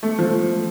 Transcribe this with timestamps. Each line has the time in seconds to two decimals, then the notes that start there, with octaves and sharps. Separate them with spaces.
0.03 A3
0.19 F3